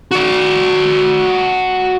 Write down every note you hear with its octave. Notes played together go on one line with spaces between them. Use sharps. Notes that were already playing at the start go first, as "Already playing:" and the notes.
F#4 D5